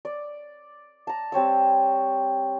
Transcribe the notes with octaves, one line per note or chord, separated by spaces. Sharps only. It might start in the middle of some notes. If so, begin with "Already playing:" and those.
D5
A5 A#5
G3 C4 C#5 E6